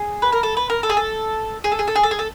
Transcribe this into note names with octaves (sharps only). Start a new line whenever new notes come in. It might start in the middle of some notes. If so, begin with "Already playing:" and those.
Already playing: G#4
B4
A#4
A4
B4
A#4
A4
G#4
A4
G#4
A4
G#4
A4
G#4
A4
G#4
A4